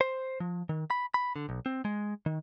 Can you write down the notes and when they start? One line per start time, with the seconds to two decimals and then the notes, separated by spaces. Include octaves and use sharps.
0.01 C5
0.40 F3
0.69 D#3
0.90 B5
1.14 B5
1.36 D3
1.49 B1
1.66 C4
1.85 G#3
2.26 D#3